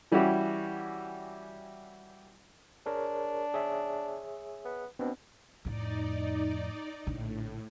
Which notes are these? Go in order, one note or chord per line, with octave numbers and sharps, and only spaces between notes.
E3 G3 C#4 E4 F#4 G4
D4 G#4 A#4 C#5
G#4 C#5 E5
B3
B2 B3 C4 D4
F2 A2 D#4 D5
A#1 A2 D3